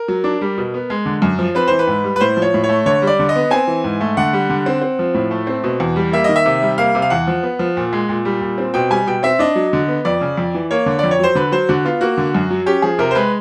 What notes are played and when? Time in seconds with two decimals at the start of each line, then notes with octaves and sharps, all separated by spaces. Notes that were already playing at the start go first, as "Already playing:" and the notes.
Already playing: A#4
0.08 F#3
0.24 D4
0.41 G3
0.58 B2
0.74 B3
0.90 G#3
1.06 D3
1.22 F#2
1.39 F3
1.55 C4 B4
1.68 E3 C5
1.79 B4
1.87 G#2
2.04 G3
2.16 B4
2.20 A2 C5
2.37 F3
2.42 C#5
2.54 A2
2.64 C#5
2.69 A3
2.86 D3 C#5
3.02 G3
3.07 D5
3.19 D3
3.29 D#5
3.36 B3
3.51 C4 G#5
3.68 E3
3.84 G#2
4.01 A3
4.17 D3 F#5
4.33 G3
4.50 D3
4.66 C4
4.82 C4
4.99 F3
5.14 A2
5.31 A3
5.47 C4
5.64 B2
5.80 E2
5.96 G3
6.12 A#3 E5
6.24 D#3 D#5
6.36 E5
6.46 C3
6.62 G3
6.78 A#3 F5
6.95 C3
7.02 F5
7.10 E2 F#5
7.27 F3
7.43 B3
7.59 F3
7.77 A#2
7.93 G#3
8.09 A#2
8.25 G3
8.41 A#2
8.58 C4
8.74 B2 G5
8.90 G3 G#5
9.07 B2 G5
9.23 C4 E5
9.39 D4 D#5
9.55 F#3
9.73 D3
9.88 B3
10.05 F2 D5
10.21 C#3
10.37 F2
10.55 E3
10.71 A#3 C#5
10.86 D3
10.99 F2 D5
11.11 C#5
11.19 F#3 C5
11.35 D3 B4
11.52 F#3 C5
11.69 D3 F#4
11.85 B3 F4
12.01 A#3 F#4
12.18 D3
12.34 F#2
12.51 F#3
12.66 C#4 G4
12.82 F3 G#4
12.99 C3 A#4
13.11 C5
13.15 G#3 B4